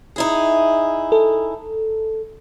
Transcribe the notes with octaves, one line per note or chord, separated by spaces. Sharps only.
D#4 E4 G#4
A4